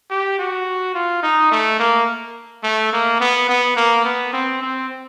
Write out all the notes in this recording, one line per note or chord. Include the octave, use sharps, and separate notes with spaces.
G4
F#4
F4
D#4
A3
A#3
A3
A#3
B3
B3
A#3
B3
C4
C4